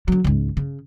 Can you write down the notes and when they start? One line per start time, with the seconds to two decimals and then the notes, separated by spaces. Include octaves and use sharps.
0.08 D3 F#3
0.24 C#2 G#2
0.57 C#3